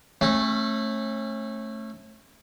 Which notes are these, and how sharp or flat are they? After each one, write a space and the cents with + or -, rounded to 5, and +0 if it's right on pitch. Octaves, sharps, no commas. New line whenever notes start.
A3 +0 C#4 -35